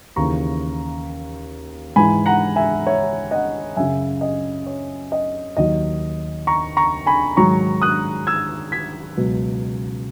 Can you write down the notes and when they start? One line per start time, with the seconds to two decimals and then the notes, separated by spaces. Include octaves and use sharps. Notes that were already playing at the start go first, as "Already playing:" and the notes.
0.16 D#2 C#3 E3 A#5 C#6
1.96 G#2 E3 G#5 B5
2.26 F#5 A#5
2.56 E5 G#5
2.86 C#5 E5
3.31 D#5 F#5
3.76 F#2 C#3 F#3 E5 G#5
4.21 D#5
4.67 C#5
5.12 D#5
5.57 D#2 D#3 F#3 D#5
6.47 A#5 C#6
6.77 A#5 C#6
7.06 G#5 B5
7.37 G#2 D#3 F#3 A#5 C#6
7.82 D#6 F#6
8.27 E6 G#6
8.72 G#6 B6
9.17 C#2 B2 F#3